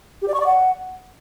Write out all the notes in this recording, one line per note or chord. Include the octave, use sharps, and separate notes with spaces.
G4
D5
C#6
D5
F#5